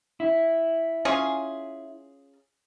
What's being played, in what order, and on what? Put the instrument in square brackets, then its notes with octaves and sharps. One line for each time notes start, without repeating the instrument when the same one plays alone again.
[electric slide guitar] E4
[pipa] C#4 F4 G#4